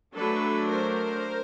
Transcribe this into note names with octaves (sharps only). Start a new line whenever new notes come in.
F#3 A3 D4 A4 B4
A#4 C5